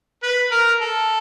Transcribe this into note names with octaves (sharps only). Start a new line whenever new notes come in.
B4
A#4
A4